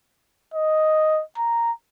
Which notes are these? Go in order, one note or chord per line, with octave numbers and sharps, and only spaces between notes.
D#5
A#5